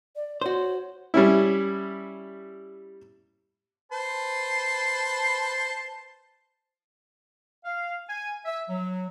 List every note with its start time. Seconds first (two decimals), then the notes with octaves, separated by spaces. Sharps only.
0.16 D5
0.41 F#4 C5 C#5
1.14 G3 C#4 E4
3.92 B4 C5 A5
7.65 F5
8.09 G#5
8.45 E5
8.69 F#3